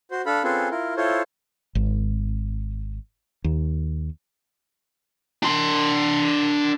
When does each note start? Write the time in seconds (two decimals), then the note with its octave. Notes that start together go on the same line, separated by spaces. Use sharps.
0.11 F#4 C5
0.26 D4 A4 F5 B5
0.44 C4 C#4 F4 G#4 A4 B4
0.71 E4 F4 A#4
0.97 E4 F4 A4 C5 C#5
1.75 G#1
3.44 D#2
5.43 D4 C6